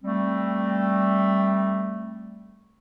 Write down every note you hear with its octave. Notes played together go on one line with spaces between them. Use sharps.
G3 A3 C4